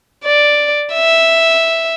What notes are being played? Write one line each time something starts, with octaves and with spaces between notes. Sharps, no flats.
D5
E5